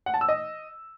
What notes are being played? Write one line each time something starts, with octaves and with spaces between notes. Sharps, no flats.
F#5
A5
E6
D#5